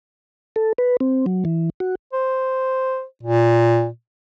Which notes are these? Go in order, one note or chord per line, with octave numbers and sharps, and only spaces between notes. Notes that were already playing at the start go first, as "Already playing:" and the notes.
A4
B4
C4
F#3
E3
F#4
C5
A#2